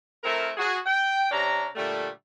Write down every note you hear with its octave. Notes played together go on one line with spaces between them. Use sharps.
A3 C4 E4 A#4
F#4 G#4
G5
C3 C#4 D4 A#5
A#2 D3 G3 A3